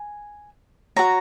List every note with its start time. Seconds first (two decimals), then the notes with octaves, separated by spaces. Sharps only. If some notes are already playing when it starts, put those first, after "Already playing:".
Already playing: G#5
0.96 F#4 C#5 A#5